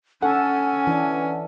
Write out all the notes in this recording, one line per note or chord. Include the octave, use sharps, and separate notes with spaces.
C#4 A4 F#5 G#5
E3 D4